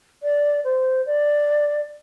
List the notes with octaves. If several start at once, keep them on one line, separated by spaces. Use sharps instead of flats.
D5
C5
D5